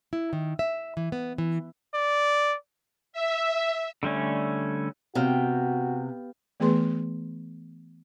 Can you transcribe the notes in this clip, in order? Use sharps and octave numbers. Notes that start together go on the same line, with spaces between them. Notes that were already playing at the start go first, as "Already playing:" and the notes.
E4
D#3
E5
E3
B3
E3
D5
E5
D3 G3 A3 C#4
C3 B3 F#4 F5 G5
E3 A3 B3 G#4 B4 C6